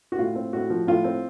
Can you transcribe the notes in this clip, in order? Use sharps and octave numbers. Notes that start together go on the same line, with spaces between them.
F#4
A2 F4
C4
A2 F#4
F3
A2 F4
C4